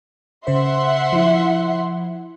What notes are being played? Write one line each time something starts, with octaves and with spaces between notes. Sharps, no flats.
C#3 C5 E5 F#5 C6
F3 E4